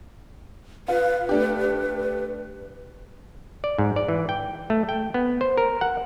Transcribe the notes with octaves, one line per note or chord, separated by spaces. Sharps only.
F4 B4
A3 D4 G4
D5
G#2
D5
E3
G5
A3
G5
B3
C5
A#4
F#5